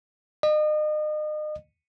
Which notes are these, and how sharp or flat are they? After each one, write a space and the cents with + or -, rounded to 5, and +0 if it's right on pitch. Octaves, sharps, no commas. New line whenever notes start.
D#5 -35